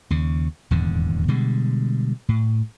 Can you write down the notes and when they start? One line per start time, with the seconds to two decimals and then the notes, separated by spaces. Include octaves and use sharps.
0.11 D#2 C#3
0.71 D#1 E2 G#2 D3
1.28 B2 D3 G3 G#3
2.29 A2